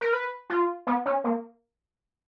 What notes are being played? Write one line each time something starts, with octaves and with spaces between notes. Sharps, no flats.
A#4
B4
F4
B3
C#4
A#3